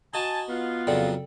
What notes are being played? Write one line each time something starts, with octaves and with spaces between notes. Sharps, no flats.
D#4 F#4 G#5 A5
B3 F4
F2 C#3 F#3 A4 D5 G5